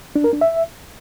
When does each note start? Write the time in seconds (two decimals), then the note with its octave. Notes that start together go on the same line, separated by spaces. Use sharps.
0.16 D4
0.24 A#4
0.33 D4
0.41 E5